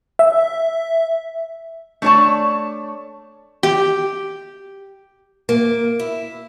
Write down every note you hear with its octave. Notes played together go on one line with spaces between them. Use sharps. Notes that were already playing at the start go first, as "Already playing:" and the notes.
E5
A3 D4 G#4 C#5 D5 A5
G4
A#3
E4